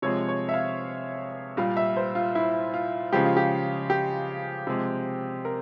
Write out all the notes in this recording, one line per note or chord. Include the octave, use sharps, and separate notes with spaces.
C3 F3 G#3 C#5
C#5
E5
F5
A#2 G3 F5
E5
C5
F4
E4
F4
C#3 F3 G#3 G4
F4
G4
G4
C3 F3 G#3
A#4